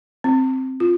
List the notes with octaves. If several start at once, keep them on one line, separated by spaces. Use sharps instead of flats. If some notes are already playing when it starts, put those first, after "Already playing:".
C4
F4